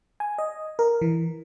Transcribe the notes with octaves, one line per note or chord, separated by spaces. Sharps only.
G#5
D#5
A#4
E3